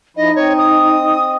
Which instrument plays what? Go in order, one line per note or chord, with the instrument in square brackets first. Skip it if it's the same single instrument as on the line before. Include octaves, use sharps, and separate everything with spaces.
[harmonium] F3 E4 [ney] D#4 [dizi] D#5
[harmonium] C4 D#5 [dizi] C#5
[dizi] D#6